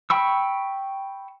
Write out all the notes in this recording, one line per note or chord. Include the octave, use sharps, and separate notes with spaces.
G5 B5 C#6 E6